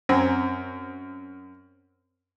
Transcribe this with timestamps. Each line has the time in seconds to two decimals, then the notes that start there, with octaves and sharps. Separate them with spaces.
0.09 F#2 C4 G#5 A#5